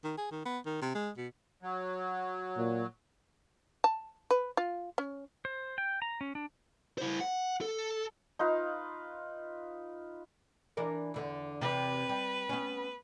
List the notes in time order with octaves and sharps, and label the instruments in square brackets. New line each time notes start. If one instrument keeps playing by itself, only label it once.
[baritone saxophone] D#3
G#4
D#3
B3
D#3
C3
G#3
B2
[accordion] F#3
[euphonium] A#2
[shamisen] A5
B4
F4
C#4
[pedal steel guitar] C5
G5
A#5
C#4
D4
[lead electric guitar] E4 C5
F#5
A4
[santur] D#4 F4 B4 F5
[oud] E3 D4 A#4
E2 D3
[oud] E2 C3 [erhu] B4
[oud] G3
B3 C#4